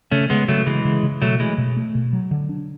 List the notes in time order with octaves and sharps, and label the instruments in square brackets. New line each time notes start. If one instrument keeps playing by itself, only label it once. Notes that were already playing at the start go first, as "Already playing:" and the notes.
[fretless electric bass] C#3 [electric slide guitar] A3 C#4
[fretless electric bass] C#3 [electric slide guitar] G#3 B3
[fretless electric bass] C#3 [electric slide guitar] F#3 A3
[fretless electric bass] C#3 [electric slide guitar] E3 G#3
[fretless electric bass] C#3
C#3
[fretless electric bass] B2 [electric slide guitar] F#3 A3
[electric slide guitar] E3 G#3 [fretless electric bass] A3
[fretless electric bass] B2
A3
B2
F#3
D3
D4